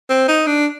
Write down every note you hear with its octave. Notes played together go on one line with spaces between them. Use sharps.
C4
D#4
D4